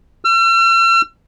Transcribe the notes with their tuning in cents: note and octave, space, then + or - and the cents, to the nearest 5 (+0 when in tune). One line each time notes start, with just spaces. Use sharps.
E6 +45